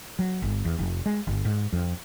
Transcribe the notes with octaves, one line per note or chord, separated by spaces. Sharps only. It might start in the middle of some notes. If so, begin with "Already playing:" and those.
F#3
G1
E2
F1
G#3
G1
G#2
F2